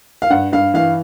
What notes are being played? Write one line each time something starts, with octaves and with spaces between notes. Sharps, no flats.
F5
G2 F#5
G2 F5
E3 F5